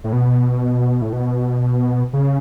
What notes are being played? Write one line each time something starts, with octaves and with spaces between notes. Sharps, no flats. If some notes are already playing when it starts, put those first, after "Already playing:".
A2
B2
A2
B2
C#3